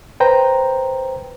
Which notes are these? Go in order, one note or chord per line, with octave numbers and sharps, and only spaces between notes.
B4 C5 G5 A#5